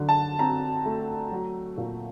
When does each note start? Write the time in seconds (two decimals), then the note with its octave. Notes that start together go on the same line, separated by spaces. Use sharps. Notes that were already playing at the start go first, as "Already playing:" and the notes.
Already playing: D3 F#3
0.09 A5
0.39 C4 A#5
0.86 A3
1.32 F#3
1.77 A#2